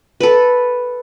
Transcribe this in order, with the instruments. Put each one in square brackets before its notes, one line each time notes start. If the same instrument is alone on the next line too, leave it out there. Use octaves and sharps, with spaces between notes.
[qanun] A4 B4